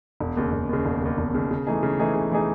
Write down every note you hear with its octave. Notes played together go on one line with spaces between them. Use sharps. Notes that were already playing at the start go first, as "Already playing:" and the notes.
E1
D#2 C#3
E1
D#2 C#3
E1
D#2 C#3
E1
D#2 C#3
C#3
E3 A3 D#4 G#4
C#3
E3 A3 D#4 G#4
C#3
E3 A3 D#4 G#4